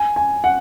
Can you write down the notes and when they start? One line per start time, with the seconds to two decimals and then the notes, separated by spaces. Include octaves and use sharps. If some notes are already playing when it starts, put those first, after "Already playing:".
Already playing: G#5
0.16 G#5
0.44 F#5